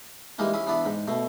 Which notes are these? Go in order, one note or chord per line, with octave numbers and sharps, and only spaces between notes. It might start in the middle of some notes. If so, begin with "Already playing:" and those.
E3 G3 G#3 A#3 D#4
C#4 E4 G#4
E3 B3 D4 E4 D5
G#2
B2 A3